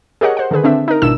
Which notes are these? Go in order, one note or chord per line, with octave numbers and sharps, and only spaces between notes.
G4 G#4 A#4 C#5 D#5 F#5
C5 F#5
D3 D#3 G#4 B4
D3 C4 D4 E5
D#4 A#4
G#1 B2 D4 E4 E6 E7